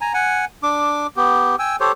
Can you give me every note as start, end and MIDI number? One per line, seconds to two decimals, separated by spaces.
0.01 0.13 80
0.01 0.13 82
0.14 0.45 78
0.14 0.45 80
0.63 1.07 62
0.63 1.07 86
1.17 1.56 59
1.17 1.56 67
1.59 1.76 79
1.59 1.76 80
1.59 1.76 88
1.80 1.92 67
1.80 1.92 69
1.80 1.92 72
1.80 1.92 73